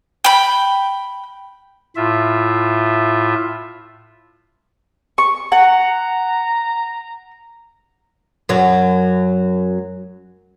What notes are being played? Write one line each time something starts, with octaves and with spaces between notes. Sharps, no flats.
G5 B5
A2 F4 E5
C#6
F#5 A#5
F#2 F#3